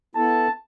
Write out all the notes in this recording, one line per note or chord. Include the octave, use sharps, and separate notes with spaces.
B3 E4 A4 A5